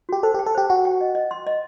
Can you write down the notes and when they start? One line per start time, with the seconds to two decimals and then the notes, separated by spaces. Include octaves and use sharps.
0.09 F#4 G4
0.23 A4 C5
0.34 G4
0.39 G5
0.46 A4
0.55 G4 C5
0.69 F#4 G5
0.85 G5
1.01 D#5
1.15 D#5
1.31 C6
1.47 D#5